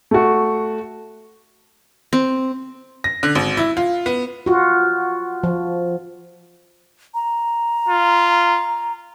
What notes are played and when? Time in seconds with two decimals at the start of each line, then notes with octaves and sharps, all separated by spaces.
0.11 A3 F#4
2.13 C4
3.04 A#6
3.23 D3
3.35 G#1
3.57 E4
3.77 F4
4.06 B3
4.46 F4 F#4
5.43 F3
7.14 A#5
7.89 F4